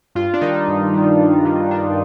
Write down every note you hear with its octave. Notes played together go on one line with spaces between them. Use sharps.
G2 F4
D4
D#3 G3 D#4
G2
D#3 G3
G2
D#3 G3
G2 D4